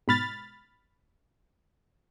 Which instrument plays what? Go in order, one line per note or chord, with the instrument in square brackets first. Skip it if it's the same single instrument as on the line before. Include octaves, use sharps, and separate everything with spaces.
[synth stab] G#2 B2 B5 F6 A6